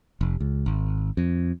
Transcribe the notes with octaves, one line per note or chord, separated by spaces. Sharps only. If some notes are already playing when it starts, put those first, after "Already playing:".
F1
C#2
G#1
F2